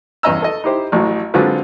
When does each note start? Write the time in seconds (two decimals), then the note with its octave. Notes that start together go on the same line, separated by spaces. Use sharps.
0.23 E2 G2 C#4 D#5 A#5 E6
0.42 A4 D#5
0.64 D#4 E4 G4 C5
0.92 A1 A2 F#3
1.34 D3 F#3 G#3 C4 F4 B4